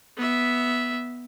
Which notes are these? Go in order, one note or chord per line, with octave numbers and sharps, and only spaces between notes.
B3 E5